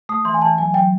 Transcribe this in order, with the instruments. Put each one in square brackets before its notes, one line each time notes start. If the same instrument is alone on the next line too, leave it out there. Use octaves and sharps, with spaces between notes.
[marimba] A3 [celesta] D#6
[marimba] E3 [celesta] C6
[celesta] G#5
[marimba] E3 [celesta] A5
[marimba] F#3 [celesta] G#5
[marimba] F#3 [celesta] G5